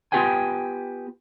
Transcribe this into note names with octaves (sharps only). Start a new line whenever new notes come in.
B3 F4 G4 B4 G5 G#5